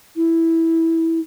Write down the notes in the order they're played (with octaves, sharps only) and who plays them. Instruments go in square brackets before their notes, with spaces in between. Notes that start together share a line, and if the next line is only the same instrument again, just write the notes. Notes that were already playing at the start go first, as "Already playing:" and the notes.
[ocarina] E4